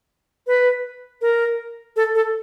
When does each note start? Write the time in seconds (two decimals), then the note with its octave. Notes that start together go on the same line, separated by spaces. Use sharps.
0.47 B4
1.21 A#4
1.96 A4
2.15 A4